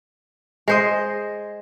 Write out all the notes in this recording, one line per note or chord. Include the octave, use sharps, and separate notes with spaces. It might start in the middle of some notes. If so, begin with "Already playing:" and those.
G#3 C5 D#5